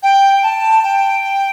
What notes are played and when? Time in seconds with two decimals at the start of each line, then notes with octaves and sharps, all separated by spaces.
0.02 G5
0.42 A5
0.83 G5